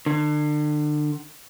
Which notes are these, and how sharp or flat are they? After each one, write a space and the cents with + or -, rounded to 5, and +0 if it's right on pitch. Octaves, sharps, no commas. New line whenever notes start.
D3 +35